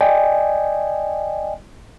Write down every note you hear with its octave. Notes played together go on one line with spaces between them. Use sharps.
D5 D#5 G5 G#5